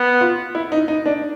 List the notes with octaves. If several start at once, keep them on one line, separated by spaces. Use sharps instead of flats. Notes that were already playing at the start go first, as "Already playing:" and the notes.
Already playing: B3
F4
E4
D#4
D#4
D4